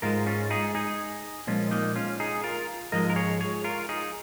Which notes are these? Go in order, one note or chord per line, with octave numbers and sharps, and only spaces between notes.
G#2 G#3 F4 A#4
C#4 F4
D#4 G#4
D#4 G#4
A#2 F3 G#3 C#4 F4
A#3 D#4
C#4 F4
D#4 G#4
F4 A#4
G#2 F3 G#3 A#4 D#5
A#4
G#4 C#5
G#4 C#5
F4 A#4
D#4 G#4